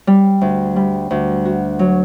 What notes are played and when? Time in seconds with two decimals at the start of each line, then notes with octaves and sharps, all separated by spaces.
0.07 G3
0.41 D2
0.76 G3
1.11 D2
1.45 F#4
1.79 F#3